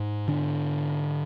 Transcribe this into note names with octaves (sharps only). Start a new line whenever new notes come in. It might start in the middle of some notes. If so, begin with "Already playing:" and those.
Already playing: G#2
D3 D4